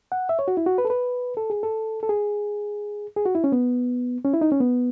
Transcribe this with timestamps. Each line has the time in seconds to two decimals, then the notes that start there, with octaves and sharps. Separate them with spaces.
0.12 F#5
0.29 E5
0.39 C#5
0.48 F#4
0.57 E4
0.66 F#4
0.78 B4
0.85 A4
0.90 B4
1.37 A4
1.50 G#4
1.63 A4
2.03 A4
2.09 G#4
3.16 G#4
3.26 F#4
3.35 E4
3.44 C#4
3.52 B3
4.25 C#4
4.33 E4
4.41 D#4
4.52 C#4
4.60 B3